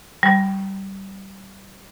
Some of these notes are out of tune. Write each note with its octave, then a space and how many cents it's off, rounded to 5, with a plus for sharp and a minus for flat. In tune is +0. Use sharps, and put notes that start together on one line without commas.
G3 -20